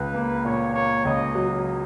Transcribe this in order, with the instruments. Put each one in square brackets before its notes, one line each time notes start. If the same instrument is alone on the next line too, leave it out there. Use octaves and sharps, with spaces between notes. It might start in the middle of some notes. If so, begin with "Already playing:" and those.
Already playing: [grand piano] C#2 [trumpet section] B4
[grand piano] A#3
[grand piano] A#2 [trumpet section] C#5
[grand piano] A#3 [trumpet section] C#5
[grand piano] C#2 [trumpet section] D#5
[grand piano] F#3